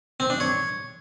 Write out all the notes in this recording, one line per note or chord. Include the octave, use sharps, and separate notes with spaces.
C4
D4
C#5